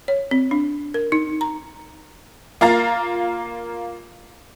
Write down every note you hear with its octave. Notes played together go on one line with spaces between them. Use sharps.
C#5
C4
D4
A#4
D#4
A#5
A#3 F4 F5 A#5 A6